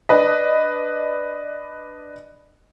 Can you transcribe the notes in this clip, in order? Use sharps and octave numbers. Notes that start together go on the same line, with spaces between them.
D4 B4 D#5